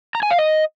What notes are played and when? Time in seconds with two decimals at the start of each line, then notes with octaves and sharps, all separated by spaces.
0.15 A#5
0.23 G#5
0.31 F5
0.38 D#5